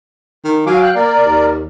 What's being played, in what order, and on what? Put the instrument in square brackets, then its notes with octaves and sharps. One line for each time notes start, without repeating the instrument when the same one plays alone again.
[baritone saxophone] D#3
[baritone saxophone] F#3 [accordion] F5 G#5 D6
[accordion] F5 G5 F#6
[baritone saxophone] A#3 [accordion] A#4 D5
[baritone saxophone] D#2